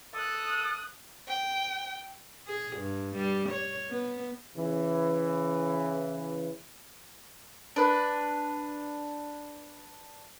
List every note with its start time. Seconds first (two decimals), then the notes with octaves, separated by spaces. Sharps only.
0.14 A4 D#6 F#6
1.28 G5
2.47 G#4
2.76 G2
3.16 G3
3.49 C#5
3.90 B3
4.56 C#3 E3
7.76 D4 B4